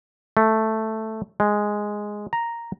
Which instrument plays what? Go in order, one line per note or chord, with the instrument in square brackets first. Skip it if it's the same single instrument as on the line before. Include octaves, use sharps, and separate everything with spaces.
[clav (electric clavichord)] A3
G#3
A#5